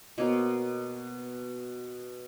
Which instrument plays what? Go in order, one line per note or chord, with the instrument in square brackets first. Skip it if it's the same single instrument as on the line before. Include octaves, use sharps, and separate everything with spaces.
[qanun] B2 A#3 C5 C#5